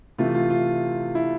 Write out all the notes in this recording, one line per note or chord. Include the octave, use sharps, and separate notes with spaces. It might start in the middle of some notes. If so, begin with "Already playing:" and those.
C3 E3 A3 F4
F4
F4
E4